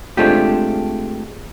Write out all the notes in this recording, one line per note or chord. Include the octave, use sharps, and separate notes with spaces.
G#3 A3 C4 D4 F4 G4